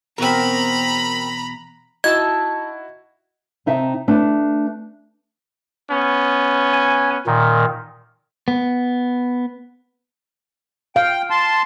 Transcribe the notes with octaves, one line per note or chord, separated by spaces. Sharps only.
E2 B2 C4 F#4 A#4 A#5 B5
D#4 E4 F#4 D#5 A5 E6 G#6
C3 D#4 E5 G5 A5
A3 D4 B4
B3 C#4
G#5
A#2 D#3
B3
F5 G5
A5 C6